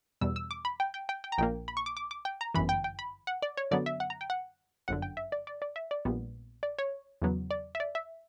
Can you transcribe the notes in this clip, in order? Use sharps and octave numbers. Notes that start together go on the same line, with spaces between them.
E2 B2 G3 E6
E6
D6
B5
G5
G5
G5
G5
A#5
A#1 A#2 A#3 G5
B5
C#6
D6
D6
D6
G5
A#5
G1 F#2 E3 B5
G5
G5
B5
F#5
D5
C#5
F#2 D3 F#3 B3 D5
E5
F#5
A#5
G5
F#5
G1 F#2 D3 F#5
G5
E5
D5
D5
D5
E5
D5
A#1 A#2 G3 B3
D5
C#5
E2 C#3 F#3 B3
D5
E5
D5
E5